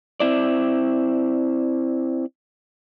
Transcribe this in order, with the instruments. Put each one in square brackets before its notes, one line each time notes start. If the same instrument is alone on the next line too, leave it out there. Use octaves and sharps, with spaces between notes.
[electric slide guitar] C4 E4 D5